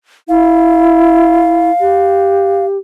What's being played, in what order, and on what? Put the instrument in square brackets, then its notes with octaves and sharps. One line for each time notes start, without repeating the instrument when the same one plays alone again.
[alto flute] E4 [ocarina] F5
[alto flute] G4